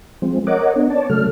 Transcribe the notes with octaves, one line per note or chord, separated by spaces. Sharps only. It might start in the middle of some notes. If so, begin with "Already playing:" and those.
F3 G#3 C4
A#4 C#5 D#5 F#5 D6
B3 D4
C#5 D5 A5
C#3 F#3 A3 A4 F6